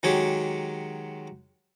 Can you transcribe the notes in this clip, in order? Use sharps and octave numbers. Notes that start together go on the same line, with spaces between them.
D#3 F#3 G#3 G4 C#5